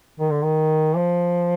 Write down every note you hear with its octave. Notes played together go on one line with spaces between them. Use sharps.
D#3
D3
D#3
F3